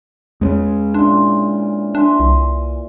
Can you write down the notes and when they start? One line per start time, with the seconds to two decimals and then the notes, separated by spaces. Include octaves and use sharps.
0.41 E2 G#3 C4 C#4
0.94 A#2 E3 D4 C6
1.95 D4 E5 G#5 C6
2.20 C2